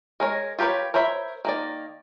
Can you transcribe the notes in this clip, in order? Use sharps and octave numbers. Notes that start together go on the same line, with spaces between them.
G#3 A#4 C#5
F4 G4 A#4 B4 C#5
A#4 C5 C#5 E5 B5
D#3 A#3 D5